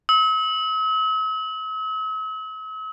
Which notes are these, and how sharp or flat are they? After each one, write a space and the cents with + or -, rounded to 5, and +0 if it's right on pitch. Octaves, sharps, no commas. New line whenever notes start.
E6 -45